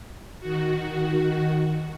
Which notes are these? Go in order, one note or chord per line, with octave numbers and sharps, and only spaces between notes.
D#3 F#4